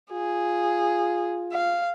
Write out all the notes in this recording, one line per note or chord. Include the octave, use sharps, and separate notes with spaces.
F4 G#4
F5